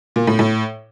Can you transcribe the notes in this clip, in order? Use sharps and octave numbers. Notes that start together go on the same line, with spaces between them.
A#2
A2
A2